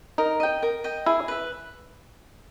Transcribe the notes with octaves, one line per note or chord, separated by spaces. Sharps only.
D#4 A#4
D#5 G5
A#4
D#5 G5
E4 G#4
B4 E5